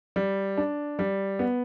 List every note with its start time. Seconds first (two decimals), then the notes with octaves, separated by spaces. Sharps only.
0.16 G3
0.57 D4
0.99 G3
1.39 B3